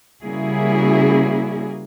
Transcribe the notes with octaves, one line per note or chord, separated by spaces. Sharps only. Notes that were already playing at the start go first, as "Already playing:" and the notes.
C#3 G3 A#3 E4 F#4 G#4